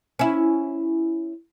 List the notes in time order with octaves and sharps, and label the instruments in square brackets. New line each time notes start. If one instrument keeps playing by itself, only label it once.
[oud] C#4 E4